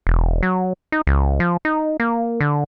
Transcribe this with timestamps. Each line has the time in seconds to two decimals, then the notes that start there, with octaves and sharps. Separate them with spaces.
0.07 E1
0.43 F#3
0.92 D#4
1.07 C#2
1.40 F3
1.65 D#4
2.00 A#3
2.40 D3